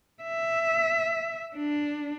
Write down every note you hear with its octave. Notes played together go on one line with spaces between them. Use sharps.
E5
D4